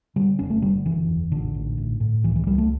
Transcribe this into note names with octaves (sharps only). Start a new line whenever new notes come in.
D3 G3
F#1 C#4
A3
D3 G3
F#1 E3
E2
A1 D3
A1
A2
A2
C#2 E3
E3
C#2 G3
A3